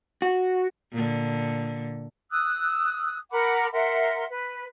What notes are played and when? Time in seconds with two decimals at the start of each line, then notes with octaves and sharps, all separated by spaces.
0.22 F#4
0.92 A#2 D3
2.30 D#6 E6 F#6
3.31 A#4 F#5 B5 D6
3.72 A#4 E5 F#5 C6
4.28 B4